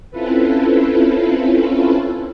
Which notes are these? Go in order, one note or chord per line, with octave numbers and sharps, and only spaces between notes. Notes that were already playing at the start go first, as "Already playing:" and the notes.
C4 C#4 E4 F4 A4 B4